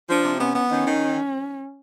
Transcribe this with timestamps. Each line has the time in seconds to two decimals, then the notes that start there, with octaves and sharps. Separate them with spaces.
0.10 F3 D4
0.25 C3
0.39 B3 C#4
0.55 B3
0.70 D#3 C#4
0.86 D#3